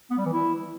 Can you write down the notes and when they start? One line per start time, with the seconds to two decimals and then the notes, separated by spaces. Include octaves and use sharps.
0.10 B3
0.18 G3
0.25 E3
0.33 E4